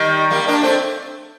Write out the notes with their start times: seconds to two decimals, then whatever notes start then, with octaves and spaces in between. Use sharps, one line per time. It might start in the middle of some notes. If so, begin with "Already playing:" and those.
Already playing: D#3 G3
0.31 G3 A#3
0.48 A#3 D4
0.63 A3 C4